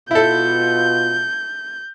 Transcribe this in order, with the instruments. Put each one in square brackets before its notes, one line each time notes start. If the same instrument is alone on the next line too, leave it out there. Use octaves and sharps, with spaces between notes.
[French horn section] B2 F4 [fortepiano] E4 A4 [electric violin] G6